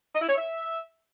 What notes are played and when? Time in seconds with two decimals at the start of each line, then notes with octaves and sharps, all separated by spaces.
0.13 D#5
0.21 E4
0.28 C#5
0.35 E5